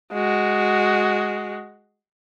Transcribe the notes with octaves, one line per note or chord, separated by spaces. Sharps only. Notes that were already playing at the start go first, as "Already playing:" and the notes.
G#3 F#4